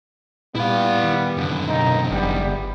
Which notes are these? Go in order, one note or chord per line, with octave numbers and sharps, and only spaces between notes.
A#2 G3 B3 E4 F5
D#3
F#2 D3
D#2 B2 D#4
G1 E2 G3 B3